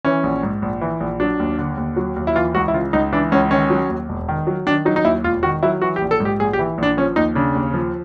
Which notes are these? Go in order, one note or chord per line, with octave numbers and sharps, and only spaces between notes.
E3 C#4
A#1
G#2
A#1
E3
A#1
F#3 D4
D#2
D3
D#2
F#3
D#2
E4
E3 F4
C#2 F#4
E4
C#3 F4
C#2 D#4
E3 D4
C#2 C#4
D#3 C#4
F#3
D#2
E1
D#3
F#3
D#3 D4
F#3 D#4
D#4
D#2 E4
E1 F4
D#3 F#4
F#3 E4
E3 F#4
G4
A#1
A4
G#2
G4
A#1 G#4
G4
E3
A#1 D4
F3 C#4
D#2 D#4
C#3 D4
D#2
F3